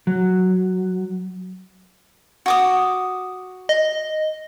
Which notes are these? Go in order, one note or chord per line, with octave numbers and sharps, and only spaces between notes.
F#3
F#4 D6 D#6
D#5